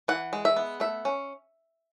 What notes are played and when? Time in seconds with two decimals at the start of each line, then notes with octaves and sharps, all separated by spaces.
0.08 E3 F#5
0.33 G#3
0.45 E5
0.56 B3
0.80 A3 E5
1.05 C#4